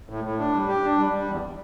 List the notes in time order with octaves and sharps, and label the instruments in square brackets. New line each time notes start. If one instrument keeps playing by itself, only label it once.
[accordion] A2
A2
D4
G3
G4
D4
G3
G3
E2